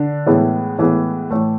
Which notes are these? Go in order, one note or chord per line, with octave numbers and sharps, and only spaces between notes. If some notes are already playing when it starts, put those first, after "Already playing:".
Already playing: D3 D4
A2 E3 G#3 B3
A2 E3 G#3 B3
A2 E3 A3